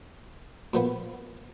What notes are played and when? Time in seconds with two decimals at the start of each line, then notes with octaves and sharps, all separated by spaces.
0.73 A#2 F3 B3